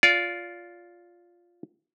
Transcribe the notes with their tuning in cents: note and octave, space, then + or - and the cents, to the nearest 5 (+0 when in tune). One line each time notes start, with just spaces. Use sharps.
F4 +0 D5 -25